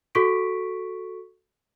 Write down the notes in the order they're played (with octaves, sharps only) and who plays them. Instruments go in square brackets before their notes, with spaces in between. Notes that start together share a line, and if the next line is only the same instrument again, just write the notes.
[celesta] F#4 A4 C#6 B6 D7